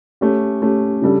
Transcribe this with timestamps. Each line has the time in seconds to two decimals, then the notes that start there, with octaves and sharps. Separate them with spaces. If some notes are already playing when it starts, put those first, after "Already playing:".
0.21 A3 C#4 G4
0.62 A3 C#4 G4
1.02 C#3 G3 D4 A4